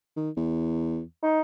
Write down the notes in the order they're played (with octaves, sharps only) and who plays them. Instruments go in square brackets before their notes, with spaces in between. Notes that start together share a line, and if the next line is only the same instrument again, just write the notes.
[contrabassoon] D#3
E2
[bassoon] D#4